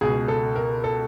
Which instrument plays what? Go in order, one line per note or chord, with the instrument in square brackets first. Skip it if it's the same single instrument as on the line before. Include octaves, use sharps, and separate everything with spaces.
[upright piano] C#2 B2 G#4
A4
A#4
A4